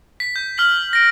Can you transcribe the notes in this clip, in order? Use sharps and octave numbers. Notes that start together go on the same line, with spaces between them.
B6
G6
F6 B6 F#7
A#6 D7